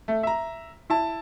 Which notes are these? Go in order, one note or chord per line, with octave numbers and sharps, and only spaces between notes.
A3
E5 A#5
E4 A5